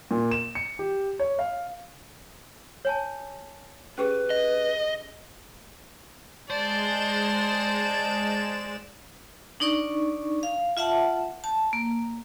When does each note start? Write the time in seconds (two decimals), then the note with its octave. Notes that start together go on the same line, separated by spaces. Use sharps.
0.11 A#2
0.31 E7
0.55 C#7
0.79 G4
1.19 C#5
1.39 F5
2.85 C#5 G#5 A5
3.98 C#4 G4 G#4 B4
4.30 D#5
6.50 G#3 C5 D5 A5 E7
9.60 D4 D#4 D5 C#6
10.43 F5
10.77 F4 E5 F#5 A5
11.44 A5
11.73 A#3